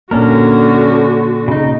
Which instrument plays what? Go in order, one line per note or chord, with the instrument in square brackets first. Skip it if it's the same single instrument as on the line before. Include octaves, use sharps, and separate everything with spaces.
[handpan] A#2 A#3 [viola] D3 F#4 [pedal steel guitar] C#4 D4 A#4
[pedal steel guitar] C#3 D#4